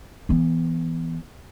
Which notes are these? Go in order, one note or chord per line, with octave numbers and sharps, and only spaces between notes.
E3 B3